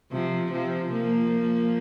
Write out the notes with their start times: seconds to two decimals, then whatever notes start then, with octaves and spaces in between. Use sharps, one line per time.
0.12 C3 F3
0.51 C3 F3
0.92 F3 A#3